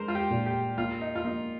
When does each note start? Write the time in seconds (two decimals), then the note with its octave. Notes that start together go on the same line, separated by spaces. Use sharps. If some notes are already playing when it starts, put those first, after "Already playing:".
Already playing: G#3 A#4 C5
0.08 F4
0.15 G4
0.30 A#2
0.46 G4
0.78 A#3 F4
1.01 D#4
1.15 F4
1.24 A#3 D#4